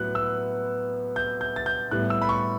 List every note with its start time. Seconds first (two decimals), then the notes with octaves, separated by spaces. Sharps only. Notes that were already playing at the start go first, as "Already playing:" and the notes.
Already playing: A2 F#3 B3 F#6
0.15 E6
1.16 G6
1.41 G6
1.56 A6
1.66 G6
1.91 A2 G3 B3 F#6
2.10 E6
2.22 B5
2.29 C#6